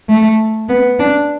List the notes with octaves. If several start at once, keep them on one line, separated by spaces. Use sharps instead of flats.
A3
B3
D4